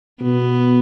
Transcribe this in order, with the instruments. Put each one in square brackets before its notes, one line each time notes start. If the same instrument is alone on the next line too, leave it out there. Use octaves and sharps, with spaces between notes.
[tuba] B2 [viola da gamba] B3